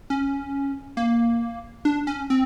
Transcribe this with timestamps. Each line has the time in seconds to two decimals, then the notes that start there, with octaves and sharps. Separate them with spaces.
0.10 C#4
0.97 A#3
1.85 D4
2.07 C#4
2.30 C4